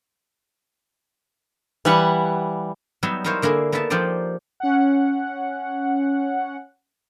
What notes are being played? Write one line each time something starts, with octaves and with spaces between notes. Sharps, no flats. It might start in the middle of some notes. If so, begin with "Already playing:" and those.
E3 G3 E5 F#5
F#3 G3 B3 D#4 E5
D#4 E4 A#4 C5 C#5 F5
D3 A#3 E4 G#4
A#3 B3 D#4 E5 A5
F3 D#4 G4 C5 D5
C#4 F#5